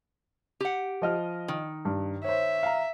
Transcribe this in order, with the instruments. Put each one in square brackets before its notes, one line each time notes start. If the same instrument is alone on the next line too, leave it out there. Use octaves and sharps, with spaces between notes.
[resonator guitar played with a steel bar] G4 F#5
[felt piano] F3 D#5 F6
[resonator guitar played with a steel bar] D#3
[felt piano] G2
[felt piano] C5 C#5 [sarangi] E5
[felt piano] F5 A#5